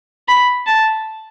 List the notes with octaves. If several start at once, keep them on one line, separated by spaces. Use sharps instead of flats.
B5
A5